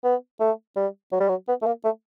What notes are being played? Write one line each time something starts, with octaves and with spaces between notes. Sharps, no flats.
B3
A3
G3
F#3
G3
F#3
B3
A3
A#3
A3